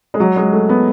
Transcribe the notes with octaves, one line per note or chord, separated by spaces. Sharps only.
G#3
F#3
G#3
A3
B3